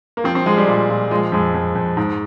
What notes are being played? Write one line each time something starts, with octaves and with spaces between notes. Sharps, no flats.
A#3
F3 C4
C4
F3 G#3
G3
A#2
A#2
F3 G#3
F2 G#3
F2
F2
G#2